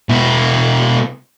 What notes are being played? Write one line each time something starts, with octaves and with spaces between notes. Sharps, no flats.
B2 E4